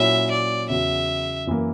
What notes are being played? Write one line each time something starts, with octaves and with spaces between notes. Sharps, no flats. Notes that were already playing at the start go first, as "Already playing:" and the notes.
Already playing: A#2 F#3 C#4 E4 E5
D5
E2 C#3 F#3 E5
F#2 E3 A#3